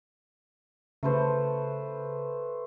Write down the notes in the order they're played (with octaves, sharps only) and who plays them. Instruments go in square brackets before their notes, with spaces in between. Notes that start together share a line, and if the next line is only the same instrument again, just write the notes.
[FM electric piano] C#3 [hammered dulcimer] A3 B4 C5